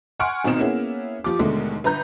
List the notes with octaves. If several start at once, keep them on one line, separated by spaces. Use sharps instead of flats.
F#5 G#5 C6 C#6 F6 D7
G#1 B2 C4 D#4 E7
A#3 B3 C#4 E4 G#4
F3 G4 D6
D#2 B2 D3 G#3 A3
G1 B4 A#5 G6